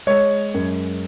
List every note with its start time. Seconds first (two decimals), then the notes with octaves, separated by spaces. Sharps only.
0.07 G#3 C#5
0.54 F#2